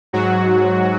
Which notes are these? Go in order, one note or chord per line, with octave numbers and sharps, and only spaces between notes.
G#2 F#3 F#4